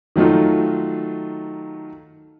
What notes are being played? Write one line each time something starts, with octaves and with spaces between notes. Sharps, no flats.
D#3 F#3 A3 D#4 F4